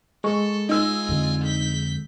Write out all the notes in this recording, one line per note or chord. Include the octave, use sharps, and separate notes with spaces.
G#3 A4 C#6
D#4 F4 G#5 E6
F2 D3 C4
G6 B6